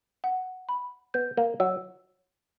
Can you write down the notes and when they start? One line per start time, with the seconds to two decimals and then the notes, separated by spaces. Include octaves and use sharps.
0.24 F#5
0.69 B5
1.14 B3 G6
1.37 A#3
1.60 F#3 E6